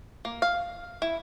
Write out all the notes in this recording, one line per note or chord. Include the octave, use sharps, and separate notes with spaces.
A#3
F5
E4